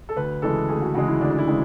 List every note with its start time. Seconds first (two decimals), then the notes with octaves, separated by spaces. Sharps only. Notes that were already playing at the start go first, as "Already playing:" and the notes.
0.09 A4
0.16 D2 B4
0.42 C#3 E3 G#3 A4
0.69 D2 G#4
0.82 F#4
0.94 C#3 E3 G#3 F#4
1.08 E4
1.20 D2 D4
1.31 D4
1.38 E4
1.47 C#3 E3 G#3